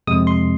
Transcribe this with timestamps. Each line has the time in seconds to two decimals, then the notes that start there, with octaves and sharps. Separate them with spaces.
0.07 F2 C3 G#3 D#6
0.27 C6